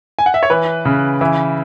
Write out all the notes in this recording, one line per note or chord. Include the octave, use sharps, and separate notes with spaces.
G#5
F#5
E5
C#5
E3 B4
C#3
E3